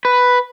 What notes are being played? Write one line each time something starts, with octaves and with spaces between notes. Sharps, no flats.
B4